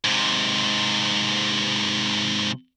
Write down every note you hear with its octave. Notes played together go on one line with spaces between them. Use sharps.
G#2 C3